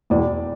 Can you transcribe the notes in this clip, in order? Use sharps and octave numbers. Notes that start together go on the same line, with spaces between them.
E1 E2 E3 D5